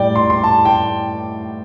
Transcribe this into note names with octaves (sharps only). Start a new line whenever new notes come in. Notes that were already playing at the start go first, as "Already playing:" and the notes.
Already playing: A2 G3 D5 G5
C6
C6
A5
G5